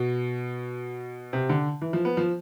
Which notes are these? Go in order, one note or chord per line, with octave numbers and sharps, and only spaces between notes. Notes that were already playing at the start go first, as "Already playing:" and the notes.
Already playing: B2
C3
D3
E3
F3
B3
F3